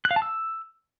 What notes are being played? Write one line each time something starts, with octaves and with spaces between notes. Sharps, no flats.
F#6
F5
A5
E6